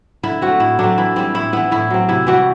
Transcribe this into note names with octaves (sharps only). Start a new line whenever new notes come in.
D3 E4
A3 C4 F#4
A2 E4
F#3 A3 C4 D4
E3 E4
G3 C4 E4
A2 E4
E3 B3 E4
A2 E4
F#3 C4
C3 E4
E3 G3 C4 F#4